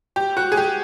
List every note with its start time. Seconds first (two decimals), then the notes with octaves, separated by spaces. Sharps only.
0.16 G4
0.37 F#4
0.52 G#4
0.57 G4